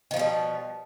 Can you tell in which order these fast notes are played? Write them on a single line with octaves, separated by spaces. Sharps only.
D#3 F3 B2 G3